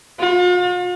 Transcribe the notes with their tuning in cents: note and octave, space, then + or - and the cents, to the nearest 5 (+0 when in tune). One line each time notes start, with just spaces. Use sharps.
F4 +45